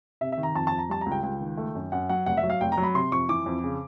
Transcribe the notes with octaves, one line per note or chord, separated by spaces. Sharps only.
C3 E5
E5
D#3
A#5
F2 A5
A5
F2
A#5
G3 A5
A#5
C#2
G5
C#2 G5
D#3
A3
F#2
F#2 F#5
F#3 F#5
F1 F#5
E5
F#3
F5
F1 G5
A#5
F#3
B5
C3 C6
F2 C#6
E3 D6
F2
C#3